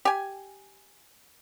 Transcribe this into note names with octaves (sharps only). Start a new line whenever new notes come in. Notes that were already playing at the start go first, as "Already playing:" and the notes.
G4 G#5